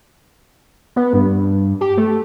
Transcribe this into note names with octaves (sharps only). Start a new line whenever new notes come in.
B3
G2
G4
A3